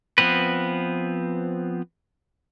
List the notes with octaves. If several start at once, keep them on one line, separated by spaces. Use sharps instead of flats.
F3 B3 C4 B4